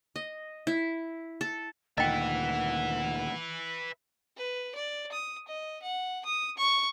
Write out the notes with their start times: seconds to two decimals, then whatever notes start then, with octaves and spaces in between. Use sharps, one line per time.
0.16 D#5
0.67 E4
1.41 A4
1.98 D2 A#2 D#3 B4 D#5 E5 F#5 G5
4.36 B4
4.75 D5
5.12 D#6
5.48 D#5
5.82 F#5
6.25 D#6
6.57 C#6